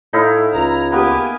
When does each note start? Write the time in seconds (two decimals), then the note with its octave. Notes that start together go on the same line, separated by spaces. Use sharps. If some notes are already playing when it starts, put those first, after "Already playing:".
0.13 A2 D#4 E4 F5
0.54 C#2 A#5
0.92 A#3 B3 G4 G#5